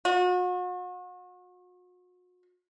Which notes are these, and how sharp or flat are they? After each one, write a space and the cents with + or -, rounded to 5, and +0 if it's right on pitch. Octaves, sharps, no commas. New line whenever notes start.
F#4 -40